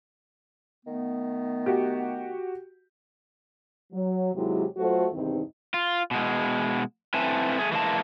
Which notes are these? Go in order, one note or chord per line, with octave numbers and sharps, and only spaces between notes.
D#3 A3 B3
F#4 G4
F#3
D#2 C3 F#3 G#3 E4 G4
F#3 A3 F4 F#4 A4 C5
E2 G2 C3 D#3 C4 D#4
F4
B2 G#3
A3 C4 E4 B4 G#5 A5
A3 G#4
E3 G#3 A#3 A5